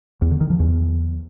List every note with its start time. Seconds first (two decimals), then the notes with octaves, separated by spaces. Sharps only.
0.22 E2
0.31 D3
0.41 D#3
0.50 F3
0.60 E2